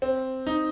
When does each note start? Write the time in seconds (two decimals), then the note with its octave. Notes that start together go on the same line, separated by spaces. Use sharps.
0.02 C4
0.47 D#4